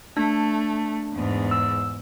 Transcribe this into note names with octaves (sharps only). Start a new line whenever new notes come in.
A3 D4
E2 G#2
E6